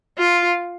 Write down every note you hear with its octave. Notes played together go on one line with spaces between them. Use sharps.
F4